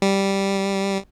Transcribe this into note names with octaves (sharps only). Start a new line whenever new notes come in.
G3